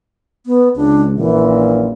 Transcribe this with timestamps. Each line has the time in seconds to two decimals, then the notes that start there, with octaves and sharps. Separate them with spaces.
0.46 B3
0.76 C#2 D4
1.18 A#1 F#2 A#2 E3